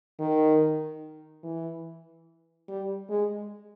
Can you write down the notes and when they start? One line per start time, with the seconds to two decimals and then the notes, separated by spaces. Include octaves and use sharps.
0.20 D#3
1.43 E3
2.68 G3
3.10 G#3